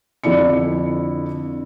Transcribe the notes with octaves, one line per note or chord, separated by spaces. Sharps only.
F2 D3 E4 D5 C#7